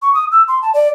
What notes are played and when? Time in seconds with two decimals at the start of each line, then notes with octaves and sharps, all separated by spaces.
0.02 C#6
0.14 D#6
0.32 E6
0.48 C6
0.62 A5
0.74 D5